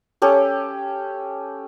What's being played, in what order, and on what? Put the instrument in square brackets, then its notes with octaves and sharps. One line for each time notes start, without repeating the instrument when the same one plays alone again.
[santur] C#4 G4 A4